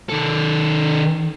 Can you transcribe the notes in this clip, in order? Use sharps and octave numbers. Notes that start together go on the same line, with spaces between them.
D#3 A4